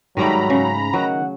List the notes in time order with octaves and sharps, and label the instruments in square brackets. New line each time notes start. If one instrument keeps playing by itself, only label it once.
[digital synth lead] G#2 [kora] D#3 G3 A3 [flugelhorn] F#3 [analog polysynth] A#5 B5
[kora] C#3
[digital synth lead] D#3 [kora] F#3 [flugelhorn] F#5